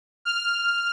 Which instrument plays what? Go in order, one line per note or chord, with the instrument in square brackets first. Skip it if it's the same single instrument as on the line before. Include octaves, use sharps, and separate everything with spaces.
[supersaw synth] F6